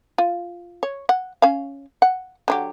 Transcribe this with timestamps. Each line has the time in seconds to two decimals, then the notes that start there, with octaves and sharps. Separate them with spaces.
0.18 F4
0.83 C#5
1.09 F#5
1.42 C#4 F5
2.02 F#5
2.48 D3 F#3 G4